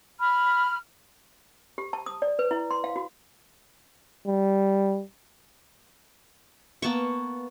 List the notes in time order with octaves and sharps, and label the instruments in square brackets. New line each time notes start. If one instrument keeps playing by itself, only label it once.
[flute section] B5 F6
[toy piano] G4
A5
D#6
D5
B4
E4
C6
F5
F#4
[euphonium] G3
[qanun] A#3 B3 A5 C#6